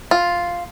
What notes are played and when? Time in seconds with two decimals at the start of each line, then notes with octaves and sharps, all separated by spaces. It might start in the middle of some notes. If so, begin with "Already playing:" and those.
0.11 F4